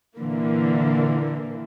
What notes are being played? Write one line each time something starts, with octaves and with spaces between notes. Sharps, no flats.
A#2 D3 E3 A#3